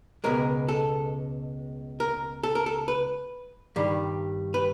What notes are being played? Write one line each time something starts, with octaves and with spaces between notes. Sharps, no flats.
C#2 B2 G#3 A#4
A4
A#4
A4
A#4
A4
B4
G2 D#3 G3
B4